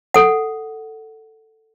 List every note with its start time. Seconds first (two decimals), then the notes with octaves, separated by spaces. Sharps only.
0.14 A4 F#5